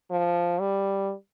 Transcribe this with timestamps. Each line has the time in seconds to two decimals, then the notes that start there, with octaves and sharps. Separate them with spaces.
0.11 F3
0.60 G3